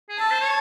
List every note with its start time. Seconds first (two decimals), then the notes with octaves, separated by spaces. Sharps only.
0.09 G#4
0.19 A4 A5
0.30 C5
0.41 C#5